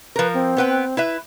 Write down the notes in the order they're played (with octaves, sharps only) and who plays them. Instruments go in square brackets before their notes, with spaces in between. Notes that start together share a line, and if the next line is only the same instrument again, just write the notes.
[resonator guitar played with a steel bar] F3 A#4 [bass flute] B4
[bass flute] C4
[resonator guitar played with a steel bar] B3 B4 G5
E4 B4 E5